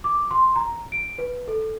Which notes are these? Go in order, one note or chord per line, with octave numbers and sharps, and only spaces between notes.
D6
C6
A#5
D7
B4
A4